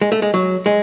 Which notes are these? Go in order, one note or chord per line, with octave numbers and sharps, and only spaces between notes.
G#3
A3
G#3
F#3
G#3